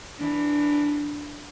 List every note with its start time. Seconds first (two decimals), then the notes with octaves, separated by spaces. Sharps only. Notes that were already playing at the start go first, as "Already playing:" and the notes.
0.18 E3 D4